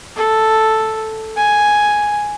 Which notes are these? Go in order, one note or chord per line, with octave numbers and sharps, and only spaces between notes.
A4
G#5